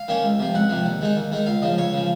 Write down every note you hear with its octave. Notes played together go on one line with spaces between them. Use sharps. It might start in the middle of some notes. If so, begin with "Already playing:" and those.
Already playing: F5
D#3 A#3 C#4
C#2
C3 F3
C#2 F#5
C3 F3
D#2
D#3 G#3 D#4
D#2
D#3 G#3 D#4
C#2 F5
C#3 F3 D#5
C#2 C#5
C#3 F3